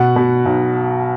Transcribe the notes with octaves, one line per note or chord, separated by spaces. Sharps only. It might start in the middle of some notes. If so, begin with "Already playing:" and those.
Already playing: B2 F#5
B2
B1